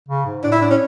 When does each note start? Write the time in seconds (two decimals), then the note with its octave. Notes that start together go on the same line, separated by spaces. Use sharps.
0.09 C#3
0.26 G#2
0.44 A2 D4
0.52 E4
0.62 D4
0.71 C#4